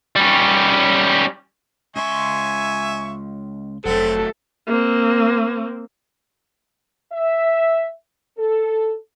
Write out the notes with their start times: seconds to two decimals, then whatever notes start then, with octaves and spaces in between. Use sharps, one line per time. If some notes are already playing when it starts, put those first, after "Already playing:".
0.16 G3 C#4
1.96 C#2 E5 G#5 C6 C#6
3.85 F1 F#3 A3 C4 A4
4.67 A#3 C4
7.12 E5
8.37 A4